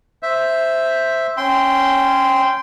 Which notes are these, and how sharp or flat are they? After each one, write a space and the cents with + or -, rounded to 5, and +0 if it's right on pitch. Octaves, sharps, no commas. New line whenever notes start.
C5 +0 E5 +0
C#4 -10 G5 +0 C6 -15